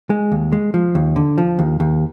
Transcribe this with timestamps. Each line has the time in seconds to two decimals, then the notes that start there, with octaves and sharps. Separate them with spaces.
0.10 G#3
0.32 D#2
0.53 G#3
0.74 F3
0.95 D#2
1.16 D3
1.38 F3
1.59 D#2
1.80 D#2